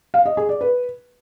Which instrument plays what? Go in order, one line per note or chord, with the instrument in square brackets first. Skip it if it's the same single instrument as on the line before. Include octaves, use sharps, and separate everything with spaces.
[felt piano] F5
D#5
G#4
D5
B4